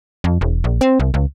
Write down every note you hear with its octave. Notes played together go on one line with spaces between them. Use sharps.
F2
E1
A#1
C4
C2
C#2